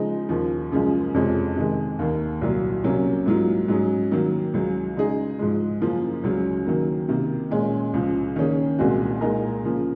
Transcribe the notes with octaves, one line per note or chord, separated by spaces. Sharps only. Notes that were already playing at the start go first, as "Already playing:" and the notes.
Already playing: C#3 F3 G#3 D#4
D#2 C#3 F3
F#2 C#3 F3 G#3
F2 C3 F3 G#3 C#4
C3 D#3 G#3
D#2 D#3 A#3
C2 A#2 F#3
C3 F#3 A#3 C#4
G#2 F#3 A#3 F4
G#2 F#3 C#4 G#4
D#3 F#3 A#3
C#2 C#3 F#3
C#3 G#3 D#4 G#4
G#2 F3 G#3
F#2 C#3 F3 A#3 F4
C#2 C#3 F#3 C#4
D#3 F#3 A#3
C3 D#3 A#3
A#2 G#3 C#4
C#2 C#3 F3
D#3 A#3 C#4 G#4
C2 A#2 G#3 C4 F#4
A#2 G#3 D#4 A#4
C#3 F3 A#3